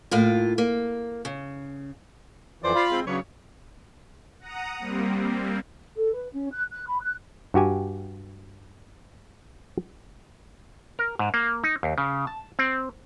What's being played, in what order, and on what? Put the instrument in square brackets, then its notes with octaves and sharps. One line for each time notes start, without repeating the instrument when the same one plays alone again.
[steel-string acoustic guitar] A2 A#3 F4
A#3
C#3
[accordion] F2 E3 F3 [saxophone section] C5 D5
[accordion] F4 F5 B5
[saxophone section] G#3 C4
[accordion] C#3 F#3 [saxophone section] D4 B4 C#5
[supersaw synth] F#5 A#5 D#6
G3 A#3 C4
[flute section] A4
B4
C#4
F#6
F#6
B5
F#6
[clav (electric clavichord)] G2 F#4 G4 G#5
A#4
G#2
A#3
D#4
D#2
C#3
A5
C4